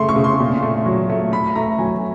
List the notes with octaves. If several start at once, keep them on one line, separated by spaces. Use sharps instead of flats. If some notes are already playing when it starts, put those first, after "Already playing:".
Already playing: C#3 A3 C6
C#6
C#3
C6
A#2
A3
F#3
A3
A3 B5
A3 A#5
F#3 G#5